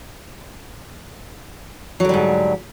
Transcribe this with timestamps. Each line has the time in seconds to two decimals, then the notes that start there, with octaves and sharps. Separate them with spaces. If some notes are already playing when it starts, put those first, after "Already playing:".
2.00 F#3
2.05 D3
2.09 G3
2.14 G#2